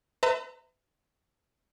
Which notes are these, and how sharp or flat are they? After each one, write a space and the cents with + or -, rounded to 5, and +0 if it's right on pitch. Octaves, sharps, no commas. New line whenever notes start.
B4 +40 E5 -10 A#5 -35